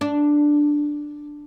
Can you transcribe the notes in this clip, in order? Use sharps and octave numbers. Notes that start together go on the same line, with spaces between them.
D4